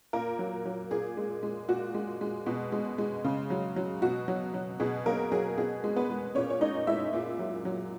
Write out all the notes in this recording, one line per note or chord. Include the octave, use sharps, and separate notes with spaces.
A#2 A#3 A#4
F#3
F#3
A#2 G#4
G#3
G#3
A#2 F#4
G#3
G#3
B2
G#3
G#3
C#3
F#3
F#3
B2 F#4
F#3
F#3
B2 G#4
F#3 A#3 A#4
F#3 G#4
B2 G#4
G#3
B3 B4
G#3
A#2 C#4 C#5
C#5
G#3 D#4 D#5
G#3 E4 E5
A#2
F#3
F#3